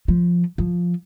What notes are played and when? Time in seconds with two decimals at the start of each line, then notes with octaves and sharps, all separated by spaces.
0.08 F3
0.58 F3